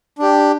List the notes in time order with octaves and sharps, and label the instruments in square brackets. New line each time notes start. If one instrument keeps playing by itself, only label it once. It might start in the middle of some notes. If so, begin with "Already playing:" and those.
[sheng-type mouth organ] D4 G4